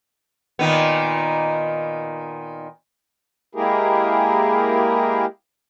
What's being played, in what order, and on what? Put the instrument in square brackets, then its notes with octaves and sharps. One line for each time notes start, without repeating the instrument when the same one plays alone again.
[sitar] A#2 D#3 B3
[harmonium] G#3 A#3 E4 G4 G#4 A#4